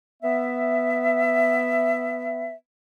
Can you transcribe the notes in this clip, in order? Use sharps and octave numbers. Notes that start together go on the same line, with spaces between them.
B3 E5